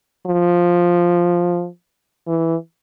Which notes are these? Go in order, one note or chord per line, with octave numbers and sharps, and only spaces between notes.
F3
E3